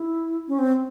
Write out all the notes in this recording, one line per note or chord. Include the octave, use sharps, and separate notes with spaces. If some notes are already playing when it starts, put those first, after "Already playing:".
Already playing: E4
C#4
C4